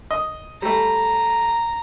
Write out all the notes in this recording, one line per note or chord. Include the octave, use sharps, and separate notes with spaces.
D#5
G3 A3 A#5